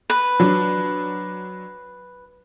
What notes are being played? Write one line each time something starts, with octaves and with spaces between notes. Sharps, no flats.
B4
F#3 D4